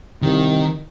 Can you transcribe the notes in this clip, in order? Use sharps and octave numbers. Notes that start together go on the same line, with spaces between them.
C2 D#3